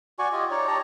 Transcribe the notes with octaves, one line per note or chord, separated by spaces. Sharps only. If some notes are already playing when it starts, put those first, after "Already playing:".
F#4 D5 G#5 C#6
F4 G4 D#5
D#4 C#5 D5
G4 C#5 A5 A#5